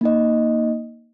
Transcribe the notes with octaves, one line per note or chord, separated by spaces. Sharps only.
A#3 D#4 D#5